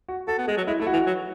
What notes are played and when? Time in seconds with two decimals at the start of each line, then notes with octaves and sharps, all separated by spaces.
0.09 F#4
0.28 F#4 A4
0.38 B3
0.48 G#3 G#4
0.57 F#3
0.67 G#3 E4
0.80 A3 E4
0.87 F#4
0.93 E3
1.07 F#3